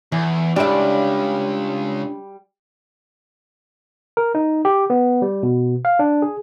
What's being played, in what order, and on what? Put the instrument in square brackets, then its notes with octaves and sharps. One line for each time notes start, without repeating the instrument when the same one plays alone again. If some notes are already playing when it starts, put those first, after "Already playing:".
[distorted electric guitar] E2 [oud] E3
[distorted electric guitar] C#2 [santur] G3 [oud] D4 E5
[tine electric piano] A#4
D#4
G4
B3
G3
B2
F5
D4
G#4